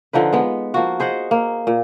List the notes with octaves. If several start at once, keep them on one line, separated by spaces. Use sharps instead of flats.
D3 F3 D#4 B4
G#3 B3
F3 A#3 F#4
G#4 C5 D#5 F#5
A#3
A#2